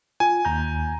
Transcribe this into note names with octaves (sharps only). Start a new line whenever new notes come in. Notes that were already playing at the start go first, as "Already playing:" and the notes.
F4 G#5
D#2 A#5 G6